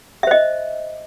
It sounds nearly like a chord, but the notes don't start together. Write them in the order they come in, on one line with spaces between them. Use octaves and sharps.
E5 C5 D#5